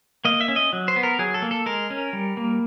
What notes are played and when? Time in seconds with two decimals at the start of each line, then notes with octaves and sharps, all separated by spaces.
0.25 A#3 D#5
0.41 E5
0.48 C#4
0.56 D#5
0.73 F#3
0.88 C5
0.96 B3
1.03 A#4
1.19 F#3 G#4
1.34 A4
1.42 A#3
1.51 A4
1.66 G#3 A#4
1.90 C#4
2.13 G3
2.37 A#3